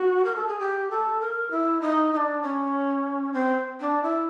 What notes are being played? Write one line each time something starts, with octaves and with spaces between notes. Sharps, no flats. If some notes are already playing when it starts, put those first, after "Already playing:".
Already playing: F#4
A#4
A4
G#4
G4
A4
A#4
E4
D#4
D#4
D4
C#4
C4
D4
E4